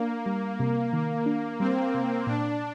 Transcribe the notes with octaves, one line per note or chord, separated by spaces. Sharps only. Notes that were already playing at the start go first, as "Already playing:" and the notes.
Already playing: A#3 D4
G3
C3
D#3
D4
G3 C4
C3
A#2 D4